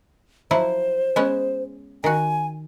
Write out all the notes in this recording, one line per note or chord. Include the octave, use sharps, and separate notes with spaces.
F3 F#3 E4 C5
G#3 B3 C#4
D#3 F#4 G#5